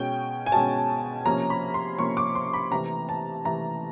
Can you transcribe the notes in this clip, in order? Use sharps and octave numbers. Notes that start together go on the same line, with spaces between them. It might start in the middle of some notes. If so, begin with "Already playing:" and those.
Already playing: B2 G#3 C#4 G5
G#5
B2 G#3 C#4 A5
C3 F3 A#3 C#4 A#5
B5
C6
C3 F3 A#3 C#4 C#6
D6
C6
B5
C3 E3 A3 A#5
A5
C3 E3 A3 A#5